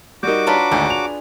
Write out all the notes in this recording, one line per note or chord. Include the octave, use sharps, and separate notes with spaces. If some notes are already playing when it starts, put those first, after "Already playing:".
G3 D#4 F#4 A#4 D6 G6
D4 F4 B4 C#5 A5 A#5
G#1 D2 G#4
F7